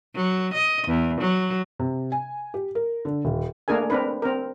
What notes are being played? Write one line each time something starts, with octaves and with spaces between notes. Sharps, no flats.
F#3
D#5
E2
F#3
C3
G#5
G4
A#4
D3
D#1
A3 A#3 D4 G#4 A#4 G#5
C4 D4 A#4 B4
C4 A#4